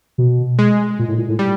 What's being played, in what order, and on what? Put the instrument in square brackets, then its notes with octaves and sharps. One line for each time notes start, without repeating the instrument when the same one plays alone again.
[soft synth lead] B2
[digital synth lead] G#3
[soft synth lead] A#2
A2
A#2
A2
[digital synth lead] G3